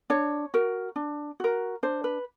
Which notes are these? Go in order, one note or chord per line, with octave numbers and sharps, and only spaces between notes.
D4 C#5
F#4 A#4
D4
F#4 A#4
D4 C5
B4